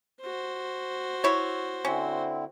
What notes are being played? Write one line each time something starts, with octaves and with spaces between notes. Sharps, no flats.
F#4 C5
E4 C#5
D3 C4 C#4 E4